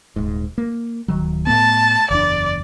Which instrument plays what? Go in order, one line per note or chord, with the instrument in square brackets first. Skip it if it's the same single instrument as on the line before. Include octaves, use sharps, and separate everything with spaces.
[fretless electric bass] D#1 G#2
A#3
D1 D#3 F#3
[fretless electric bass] A2 A3 B3 [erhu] A5
[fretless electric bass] F#1 E2 D4 [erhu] D5